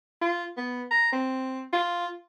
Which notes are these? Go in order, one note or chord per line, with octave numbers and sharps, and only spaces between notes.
F4
B3
A#5
C4
F4